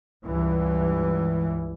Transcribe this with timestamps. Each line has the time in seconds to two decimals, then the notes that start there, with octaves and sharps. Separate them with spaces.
0.25 C#2 G2 E3